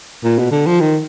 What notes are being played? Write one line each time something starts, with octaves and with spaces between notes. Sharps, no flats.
A#2
B2
D3
F3
D#3